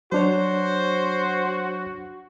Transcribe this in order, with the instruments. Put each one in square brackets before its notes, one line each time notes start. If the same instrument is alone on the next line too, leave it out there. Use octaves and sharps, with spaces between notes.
[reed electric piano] F#3 D4 C#5 [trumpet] F#4 [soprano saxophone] C5